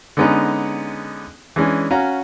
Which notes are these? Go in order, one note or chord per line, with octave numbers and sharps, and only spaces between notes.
D3 G#3 B3 C#4 D#4
E3 G#3 C#4 D4
C#4 F#4 F5 A#5